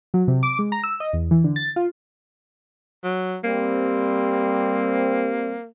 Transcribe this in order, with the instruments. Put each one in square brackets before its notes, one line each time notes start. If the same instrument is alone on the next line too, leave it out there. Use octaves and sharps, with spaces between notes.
[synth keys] F#3
C3
D6
G#3
A#5
E6
D#5
E2
E3
D3
A6
F4
[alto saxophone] F#3
[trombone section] G3 C4 [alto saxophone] A#3